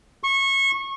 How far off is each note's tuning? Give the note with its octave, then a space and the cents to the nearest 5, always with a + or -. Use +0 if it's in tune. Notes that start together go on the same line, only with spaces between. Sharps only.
C#6 -25